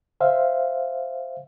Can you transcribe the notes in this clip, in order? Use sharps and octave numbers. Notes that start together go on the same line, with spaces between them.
C5 E5 F5